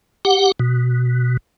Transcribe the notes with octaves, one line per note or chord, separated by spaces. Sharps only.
G4 F#5
B2